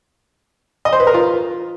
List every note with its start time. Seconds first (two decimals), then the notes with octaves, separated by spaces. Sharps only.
0.85 D#5
0.93 C5
1.00 B4
1.07 A#4
1.14 F4